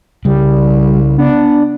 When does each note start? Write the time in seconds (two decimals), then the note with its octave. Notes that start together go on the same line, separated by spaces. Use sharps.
0.25 C2 C#3 G3
1.18 B3 D4